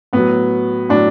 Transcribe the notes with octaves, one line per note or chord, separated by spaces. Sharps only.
A2 F#3 B3
A2 F#3 D4